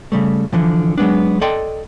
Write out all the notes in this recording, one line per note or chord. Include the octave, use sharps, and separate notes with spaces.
C#3 G3 A3
D3 E3 F3
F#3 G#3 B3 D4
A4 D5 D#5 G5 C6